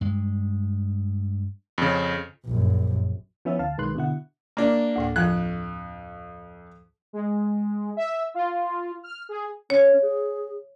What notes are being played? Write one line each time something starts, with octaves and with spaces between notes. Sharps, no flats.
G2 G#3
F2 C#3
A#1 F#2
F3 B3 C#4 E4 E5
D2 F5 A5
B1 D#3 G#3 B4 C6 F#6
B2 D3 E4 F#5
A#3 D4
D2 A2 G5
F2 F3 F#6
G#3
E5
F4
F6
G#4
C#4 C#5
G#4